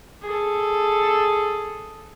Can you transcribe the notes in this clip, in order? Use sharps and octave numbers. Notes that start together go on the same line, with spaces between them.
G#4 A4